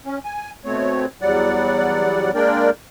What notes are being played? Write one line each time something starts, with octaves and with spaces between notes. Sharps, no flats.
C#4
G#5
B2 A3 C4 C#5
E2 F#3 G3 D5 F#5
G#3 A#3 D4 A#4 D5 G5